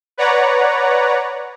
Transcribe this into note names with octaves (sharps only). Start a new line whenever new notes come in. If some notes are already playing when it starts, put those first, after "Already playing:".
B4 C#5 D5 F#5 A#5